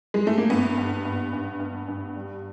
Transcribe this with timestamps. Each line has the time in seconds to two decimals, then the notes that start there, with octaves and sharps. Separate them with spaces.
0.14 G#3
0.27 A3
0.38 A#3
0.50 G2 B3
0.78 G2
1.05 G2
1.33 G2
1.60 G2
1.88 G2
2.16 G3